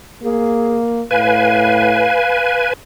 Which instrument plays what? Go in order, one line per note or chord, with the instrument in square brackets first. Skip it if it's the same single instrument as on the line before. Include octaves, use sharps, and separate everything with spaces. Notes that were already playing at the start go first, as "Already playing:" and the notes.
[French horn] A#3 [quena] G#4
[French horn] A2 [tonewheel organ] B4 G#5 [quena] F5